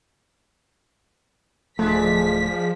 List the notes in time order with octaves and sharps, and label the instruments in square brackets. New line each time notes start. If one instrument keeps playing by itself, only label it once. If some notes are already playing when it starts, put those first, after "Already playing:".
[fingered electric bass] D1 A3 [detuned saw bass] F3 [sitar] G#3 D4 [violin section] B6